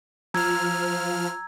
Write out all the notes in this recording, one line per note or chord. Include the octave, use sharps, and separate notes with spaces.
F3 A#5 E6 F6 G#6